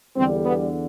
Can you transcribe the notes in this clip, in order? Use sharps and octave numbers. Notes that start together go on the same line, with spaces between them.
E2 D3 G3 C4
B3